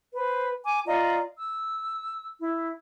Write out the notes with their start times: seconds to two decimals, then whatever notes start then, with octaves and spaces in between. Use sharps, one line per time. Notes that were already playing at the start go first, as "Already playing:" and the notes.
0.14 B4 C5
0.64 G#5 D6
0.86 F4 D5 D#5 A#5
1.37 E6
2.39 E4